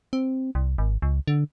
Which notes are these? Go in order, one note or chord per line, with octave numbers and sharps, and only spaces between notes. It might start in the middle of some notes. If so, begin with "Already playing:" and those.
C4
C2
G#1
C#2
D3